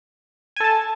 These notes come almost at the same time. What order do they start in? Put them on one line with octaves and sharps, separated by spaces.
G#5 A4 A5